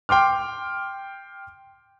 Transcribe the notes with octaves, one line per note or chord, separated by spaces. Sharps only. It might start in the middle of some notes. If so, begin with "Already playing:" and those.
G5 C6 D6 F6